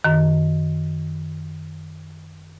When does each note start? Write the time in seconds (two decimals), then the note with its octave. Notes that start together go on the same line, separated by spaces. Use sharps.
0.04 F#2 D#3